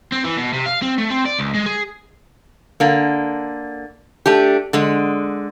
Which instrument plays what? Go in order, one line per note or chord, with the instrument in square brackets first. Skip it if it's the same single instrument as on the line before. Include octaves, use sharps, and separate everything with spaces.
[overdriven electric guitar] C4
E3
B2
C3
F5
C4
A3
C4
D5
C#2
G#3
G#4
[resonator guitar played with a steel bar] D3 A#3
A3 D4 G4
D3 G#3